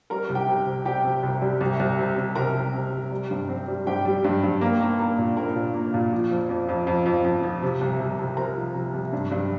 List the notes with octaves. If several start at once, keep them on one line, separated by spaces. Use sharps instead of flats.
G3 A#4 A#5
C2
G4 G5
C3
C3
G3 G4 G5
C3
C2
G3
C2
C2
C3
C2
C2 A#4 A#5
C2
C3
C2
G3
G2
C4
G3
G2 G4 G5
G3
G2
G2
A#3
A#3
A#3
A#2
A#3 A#4 A#5
A#2
A#3
A#2
F3
F2
F2
F2
F2
F2
F2
F3
C3
C2
C2
C2
C3 A#4 A#5
F3
C3
C2
G2
G2